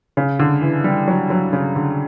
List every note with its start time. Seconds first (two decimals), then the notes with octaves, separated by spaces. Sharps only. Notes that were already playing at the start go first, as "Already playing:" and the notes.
0.17 C#3
0.39 D3
0.62 E3
0.84 G3
1.08 F#3
1.30 F#3
1.53 C#3
1.76 D3